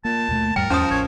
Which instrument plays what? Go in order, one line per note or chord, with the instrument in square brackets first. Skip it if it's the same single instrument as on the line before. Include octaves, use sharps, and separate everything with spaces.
[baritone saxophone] A#2 [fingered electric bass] A#3 [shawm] A5
[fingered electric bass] D#2 B2 A3
[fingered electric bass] E2 G#2 G3 [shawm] A#4 [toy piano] G5
[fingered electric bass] E2 [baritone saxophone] F3 [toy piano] C#4 D#6
[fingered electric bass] A1 [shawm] C#5